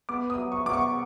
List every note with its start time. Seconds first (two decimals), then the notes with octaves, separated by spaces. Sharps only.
0.09 B3 D6
0.30 D#6
0.38 F#3
0.52 C#6
0.66 B2 D6
0.73 C#6